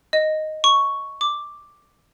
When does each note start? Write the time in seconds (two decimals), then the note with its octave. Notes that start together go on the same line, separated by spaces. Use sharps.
0.13 D#5
0.64 C#6
1.21 D6